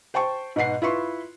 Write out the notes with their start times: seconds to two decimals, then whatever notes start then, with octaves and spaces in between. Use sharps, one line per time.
0.14 C5 G5 A5 C#6
0.56 G#2 B2 F#5 C7
0.82 E4 F4 B4 C6 C#6